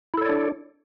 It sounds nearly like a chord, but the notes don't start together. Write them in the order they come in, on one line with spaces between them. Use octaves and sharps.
E4 A4 C#5 D5 D4